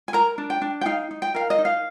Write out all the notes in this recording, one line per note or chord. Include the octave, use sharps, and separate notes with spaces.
G#5
A#4 A#5
D4
G5
D4
G5
D#4 F5
D#4
G5
A#4 F5
D#5
D#4
F5